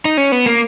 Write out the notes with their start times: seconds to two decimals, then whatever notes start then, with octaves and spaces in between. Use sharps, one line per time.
0.05 D#4
0.17 C#4
0.32 B3
0.46 A#3